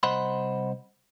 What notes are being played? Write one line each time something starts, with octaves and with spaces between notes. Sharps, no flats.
C2 C5 D#5 F#5 B5 C6